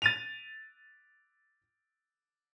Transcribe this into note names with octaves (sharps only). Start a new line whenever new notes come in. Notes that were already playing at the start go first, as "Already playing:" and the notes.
A6 D#7 F7